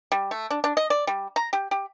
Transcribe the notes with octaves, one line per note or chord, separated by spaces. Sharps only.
G3
A3
D4
D4
D#5
D5
G3
A#5
G4
G4